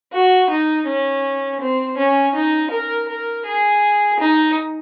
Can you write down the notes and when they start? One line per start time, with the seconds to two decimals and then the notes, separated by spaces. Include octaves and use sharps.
0.13 F#4
0.50 D#4
0.87 C#4
1.60 C4
1.97 C#4
2.34 D#4
2.71 A#4
3.08 A#4
3.45 G#4
4.20 D#4